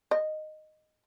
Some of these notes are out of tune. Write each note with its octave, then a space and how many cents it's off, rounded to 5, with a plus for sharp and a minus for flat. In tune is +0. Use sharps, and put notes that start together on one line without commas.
D#5 -10